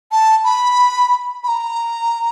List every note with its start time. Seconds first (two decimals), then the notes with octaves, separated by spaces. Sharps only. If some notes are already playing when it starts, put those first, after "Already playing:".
0.12 A5
0.45 B5
1.44 B5
1.48 A#5